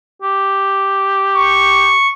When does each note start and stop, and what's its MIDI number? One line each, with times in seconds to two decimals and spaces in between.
0.22 1.93 67
1.36 2.11 85